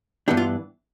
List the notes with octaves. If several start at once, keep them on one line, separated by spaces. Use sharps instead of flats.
G2 E3 B3 D4 G4
F4